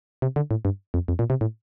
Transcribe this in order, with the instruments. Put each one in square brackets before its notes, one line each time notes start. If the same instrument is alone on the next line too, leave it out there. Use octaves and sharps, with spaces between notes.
[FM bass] C3
D3
A2
G2
F2
F2
A#2
C3
A2